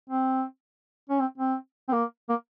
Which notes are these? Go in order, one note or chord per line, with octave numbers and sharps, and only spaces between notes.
C4
C#4
C4
C4
C4
A#3
A#3